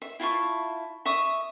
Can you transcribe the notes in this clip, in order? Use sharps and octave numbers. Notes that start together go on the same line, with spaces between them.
E5
E4 F4 A5 C#6
E5 C#6 D#6